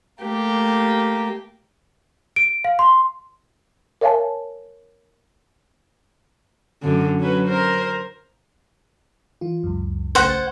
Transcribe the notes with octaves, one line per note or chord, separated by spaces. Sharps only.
A3 A#3 G4
D7
F5
C6
A#4 C#5 E5 F5 G#5 A5
F#2 D3
F#3 C#4 B4
A#4 C5
E3 F4
C#2 F#2
A#1 C#3 A3 C5 F#5
G#6 A6